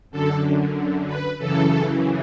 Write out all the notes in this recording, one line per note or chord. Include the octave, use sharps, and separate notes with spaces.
F#2 D3 A4
B4
F#2 C#3 E3 A4